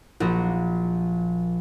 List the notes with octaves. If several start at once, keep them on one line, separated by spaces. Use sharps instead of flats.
A#1 F3 F#4 A#4